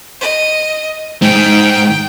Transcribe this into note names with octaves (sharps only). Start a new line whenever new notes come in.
D#5
G#2 G5